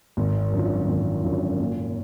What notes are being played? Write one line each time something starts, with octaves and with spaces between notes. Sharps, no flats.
G#1
F#2 D3 F3
G#1
F#2 D3 F3
A#2